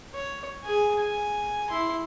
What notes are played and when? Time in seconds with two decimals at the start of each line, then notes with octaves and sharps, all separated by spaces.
0.14 C#5
0.64 G#4 G#5
0.99 G#5
1.70 E4 C6